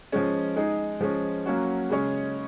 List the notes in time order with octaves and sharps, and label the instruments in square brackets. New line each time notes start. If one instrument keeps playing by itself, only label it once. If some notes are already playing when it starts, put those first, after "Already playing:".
[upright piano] F3 G#3 C#4
G#3 D#4 G#4
F3 G#3 C#4
F#3 A#3 C#4 F#4
C#3 G#3 C#4 G#4 C#5